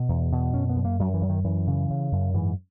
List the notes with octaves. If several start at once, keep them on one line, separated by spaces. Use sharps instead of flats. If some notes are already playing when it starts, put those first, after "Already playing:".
Already playing: B2 B3
E2
B2
F#2 C#4
B3
F#2
A#3
F#2 F#3
E3
F#2
D#3
F#2 E3
C#3
C#3
F#2
G#2 E3